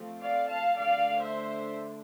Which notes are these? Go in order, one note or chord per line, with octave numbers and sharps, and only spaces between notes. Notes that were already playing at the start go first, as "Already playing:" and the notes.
Already playing: F3 A3 C4
D5 F5
F5 A5
D3 A3 D4 D5 F5
C5 E5